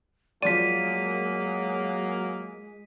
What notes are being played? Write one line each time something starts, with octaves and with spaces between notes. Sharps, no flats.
F3 F#3 G#3 A#3 D5 B6 D#7